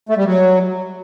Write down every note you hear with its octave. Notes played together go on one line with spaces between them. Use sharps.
A3
G3
F#3